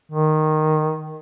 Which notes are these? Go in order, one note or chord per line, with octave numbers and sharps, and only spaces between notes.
D#3